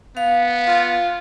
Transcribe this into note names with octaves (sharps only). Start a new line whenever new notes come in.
B3 F5
F4